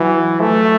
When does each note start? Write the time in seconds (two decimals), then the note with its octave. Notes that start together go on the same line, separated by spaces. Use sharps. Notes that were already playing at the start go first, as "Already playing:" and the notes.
Already playing: E3 F#3
0.41 A3